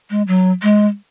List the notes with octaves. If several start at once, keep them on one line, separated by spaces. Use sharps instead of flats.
G#3
F#3
G#3